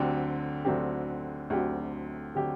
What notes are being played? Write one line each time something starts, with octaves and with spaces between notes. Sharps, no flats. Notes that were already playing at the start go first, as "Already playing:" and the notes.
Already playing: D2 D3 F#3 C4 G4
D2 D3 F#3 C4 G4
D2 D3 F#3 C4 G4
D3 F#3 C4 G4